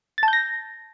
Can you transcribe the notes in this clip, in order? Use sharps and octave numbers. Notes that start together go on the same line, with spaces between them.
A6
A5
G6
A#6